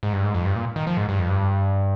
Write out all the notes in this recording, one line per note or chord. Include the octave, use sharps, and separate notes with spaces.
G#2
G2
G#2
F2
G2
A#2
D#3
F3
G#2
G2
F2
G2